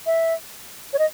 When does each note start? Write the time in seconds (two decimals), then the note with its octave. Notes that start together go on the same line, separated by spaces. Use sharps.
0.06 E5
0.93 C#5
0.99 D#5